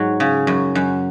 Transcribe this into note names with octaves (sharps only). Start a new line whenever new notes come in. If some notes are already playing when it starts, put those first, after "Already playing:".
Already playing: G#2 F#3
C#3
F#2
F#2